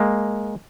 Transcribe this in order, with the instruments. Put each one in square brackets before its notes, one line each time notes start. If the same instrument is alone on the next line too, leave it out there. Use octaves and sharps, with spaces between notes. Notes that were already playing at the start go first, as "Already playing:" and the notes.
Already playing: [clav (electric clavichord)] G#3 A#3